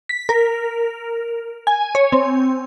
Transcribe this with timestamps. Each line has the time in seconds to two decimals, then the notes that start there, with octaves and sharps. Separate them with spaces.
0.09 B6
0.29 A#4
1.67 G#5
1.95 C#5
2.12 C4